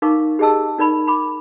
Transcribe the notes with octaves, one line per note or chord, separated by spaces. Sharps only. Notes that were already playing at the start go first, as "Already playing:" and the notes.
D#4 A#4 F5 C#6 D6
G4 G#4 D#5 A5 E6
D#4 A#4 D5 B5
B5 D6